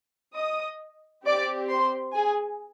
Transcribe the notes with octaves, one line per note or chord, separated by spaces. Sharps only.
D#5 D#6
C4 G4 D5 D6
C5 C6
G#4 G#5